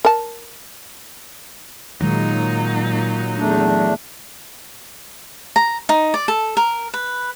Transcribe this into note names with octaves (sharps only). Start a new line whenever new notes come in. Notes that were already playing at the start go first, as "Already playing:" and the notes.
A#4 A5
A#2 D#3 F#3 G#3 D#4
E2 A3 D4
A#5
D#4
D5
A4
A#4
B4